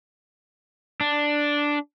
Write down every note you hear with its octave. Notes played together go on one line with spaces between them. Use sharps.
D4